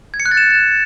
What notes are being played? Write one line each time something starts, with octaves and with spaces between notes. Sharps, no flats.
G#6
C#7
F#6
A6
E7